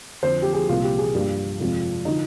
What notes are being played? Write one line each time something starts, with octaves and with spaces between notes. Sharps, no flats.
F2 D3 F3 C5
G4
G#4
C2 A#2 G3 A#3 F4
G4
G#4
G2 F3 A#3 G4
F2 C3 F3 G#3
D3 F3 D#4